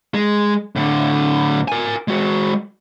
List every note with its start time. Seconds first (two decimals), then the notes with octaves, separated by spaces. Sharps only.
0.14 G#3
0.76 A2 D3
1.68 A#4 G#5
2.08 G#3 F#4